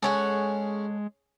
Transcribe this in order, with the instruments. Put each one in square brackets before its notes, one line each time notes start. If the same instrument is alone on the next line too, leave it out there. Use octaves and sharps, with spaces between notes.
[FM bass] G#3 [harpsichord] C#4 G#4 [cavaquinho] A4 C#5 F#5